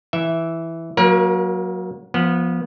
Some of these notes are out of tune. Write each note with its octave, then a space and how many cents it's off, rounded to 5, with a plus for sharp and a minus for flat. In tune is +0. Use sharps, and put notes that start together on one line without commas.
E3 +0 E5 +0
F#3 -10 A#3 +0 A#4 +40
F3 +0 B3 -25